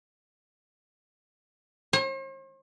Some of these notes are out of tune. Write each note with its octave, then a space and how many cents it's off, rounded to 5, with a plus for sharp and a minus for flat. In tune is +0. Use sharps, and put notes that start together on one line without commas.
C5 +45